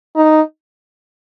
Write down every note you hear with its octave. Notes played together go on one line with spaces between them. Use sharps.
D#4